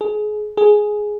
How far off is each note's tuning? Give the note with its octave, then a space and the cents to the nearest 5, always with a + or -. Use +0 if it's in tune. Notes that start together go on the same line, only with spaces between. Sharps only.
G#4 +30
G#4 +10